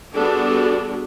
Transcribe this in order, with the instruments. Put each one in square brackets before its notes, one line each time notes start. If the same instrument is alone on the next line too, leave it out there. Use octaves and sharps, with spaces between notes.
[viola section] G3 B3 D4 F#4 G#4 A4